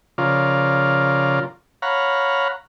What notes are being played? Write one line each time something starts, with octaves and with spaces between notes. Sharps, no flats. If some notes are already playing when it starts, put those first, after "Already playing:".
C#3 F3 F4 A#4 D5
C#5 F5 F#5 A#5 B5